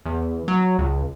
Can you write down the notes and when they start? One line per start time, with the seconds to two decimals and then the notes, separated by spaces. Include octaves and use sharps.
0.06 E2
0.48 F#3
0.79 C#2